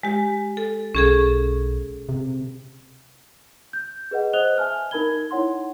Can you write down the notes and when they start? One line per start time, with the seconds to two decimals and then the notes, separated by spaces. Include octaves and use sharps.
0.03 G#3 G4
0.57 A4
0.95 B1 C#4 G#4 A4
2.09 C3
3.73 G6
4.11 G#4 B4 D#5 F#5
4.33 C5 D#5 D#6 F#6 F7 G7
4.58 E5 G#5 A5 F6
4.91 D#4 A#4 A5 B5 G#6 G7
5.31 D#4 E4 C#5 F#5 C6